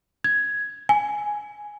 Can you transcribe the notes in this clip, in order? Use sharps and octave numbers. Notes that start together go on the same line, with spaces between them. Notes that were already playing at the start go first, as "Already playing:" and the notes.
G#6
G#5